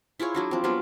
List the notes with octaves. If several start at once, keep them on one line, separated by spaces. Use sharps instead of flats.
E4 F4 G#4 C#5
F#3 D4 F#4
F3 C4
F#3 G3 B3 F4